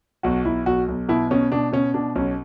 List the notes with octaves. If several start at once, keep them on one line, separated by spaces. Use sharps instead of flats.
B1 F#4
B1 E4
B1 F#4
B1
B2 E4
B2 C#4
B2 D4
B2 C#4
B2 D4
B1 C#4